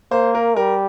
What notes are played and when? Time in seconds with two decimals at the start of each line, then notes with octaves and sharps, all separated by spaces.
0.11 A#3 C5
0.35 A#4
0.56 G3 A#4